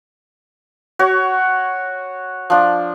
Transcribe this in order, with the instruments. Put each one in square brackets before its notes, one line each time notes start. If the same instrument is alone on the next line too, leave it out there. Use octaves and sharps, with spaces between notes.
[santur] F#4 C#5
F3 D4